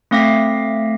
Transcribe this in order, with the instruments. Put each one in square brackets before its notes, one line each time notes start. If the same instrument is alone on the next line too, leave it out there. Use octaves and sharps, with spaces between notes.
[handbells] A3 C4 F5 D6 A#6 B6